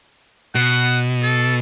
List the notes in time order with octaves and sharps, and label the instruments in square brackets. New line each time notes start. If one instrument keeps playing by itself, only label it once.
[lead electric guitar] B2 [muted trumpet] F#5
[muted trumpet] A4